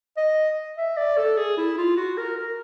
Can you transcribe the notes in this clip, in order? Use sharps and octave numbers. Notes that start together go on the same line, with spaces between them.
D#5
E5
D5
A4
G#4
E4
F4
F#4
A#4
A#4